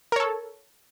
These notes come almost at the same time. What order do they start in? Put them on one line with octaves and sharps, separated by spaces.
A#4 C#5 A4